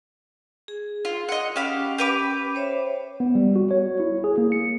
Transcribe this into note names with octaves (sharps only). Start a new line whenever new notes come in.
G#4
F4
D#5 F#5
C#4 G4 F5 G5 B5
G4 B4 D6
C5 C#5 E5
B3
G3
F#4
C#5
E4
G#4
A#3
C#7